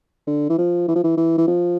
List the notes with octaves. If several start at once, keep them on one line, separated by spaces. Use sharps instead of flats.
D3
E3
F3
E3
F3
E3
E3
E3
F3